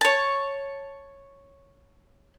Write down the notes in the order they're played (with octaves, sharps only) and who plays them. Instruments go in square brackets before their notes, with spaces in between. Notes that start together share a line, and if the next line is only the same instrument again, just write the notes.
[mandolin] C#5 A5